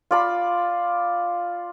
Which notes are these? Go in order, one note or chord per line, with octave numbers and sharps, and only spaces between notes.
F4 D5 B5